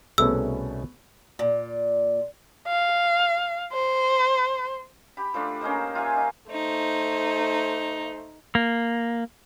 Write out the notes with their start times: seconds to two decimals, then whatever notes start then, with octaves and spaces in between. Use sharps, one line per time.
0.18 C2 B2 A3 B3 C#4 G#4 E6
1.39 A#2
2.67 F5
3.73 C5
5.17 G4 B5
5.34 F3 A3 D4
5.61 A#3 C#4 D#4 C5
5.95 F4 G4 E5 G#5
6.16 D#4
6.51 A3 D#4 C5
8.55 A#3